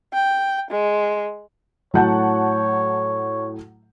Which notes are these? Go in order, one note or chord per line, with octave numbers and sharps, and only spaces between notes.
G5
G#3
A2 F#3 C#5 F#5 A5 G6